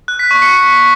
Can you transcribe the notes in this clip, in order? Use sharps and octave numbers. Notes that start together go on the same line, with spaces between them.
F#6
B6
C#6
C#7